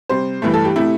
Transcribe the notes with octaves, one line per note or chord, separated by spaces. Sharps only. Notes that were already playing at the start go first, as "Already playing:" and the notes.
C3 G3 C5
G2 E3 A3
A4
G4
C3 A3 E4